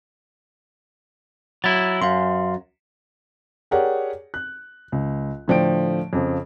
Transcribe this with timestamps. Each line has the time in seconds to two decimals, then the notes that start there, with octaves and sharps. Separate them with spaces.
1.64 F#3 E4 A6
2.02 F#2 F5 C6
3.71 G4 G#4 A#4 C#5 D5 F#5
4.34 F#6
4.92 C#2
5.48 A2 D3 F3 D5 G5 D7
6.13 F2 C#3 F3